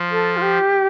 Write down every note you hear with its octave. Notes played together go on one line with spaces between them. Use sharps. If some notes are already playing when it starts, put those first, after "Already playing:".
Already playing: F3
A4
F4
G4